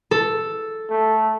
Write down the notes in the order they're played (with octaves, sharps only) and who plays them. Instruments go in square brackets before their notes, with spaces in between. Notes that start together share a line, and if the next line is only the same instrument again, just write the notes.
[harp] A4
[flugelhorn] A3